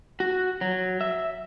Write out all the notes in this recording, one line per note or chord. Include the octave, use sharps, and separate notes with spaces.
F#4
F#3
E5